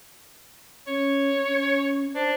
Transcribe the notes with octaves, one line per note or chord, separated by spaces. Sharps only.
C#4 C#5
C#4
D4 C5